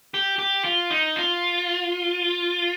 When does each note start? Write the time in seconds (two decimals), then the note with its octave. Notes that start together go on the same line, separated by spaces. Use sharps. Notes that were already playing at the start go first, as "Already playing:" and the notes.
0.14 G4
0.38 G4
0.64 F4
0.91 D#4
1.16 F4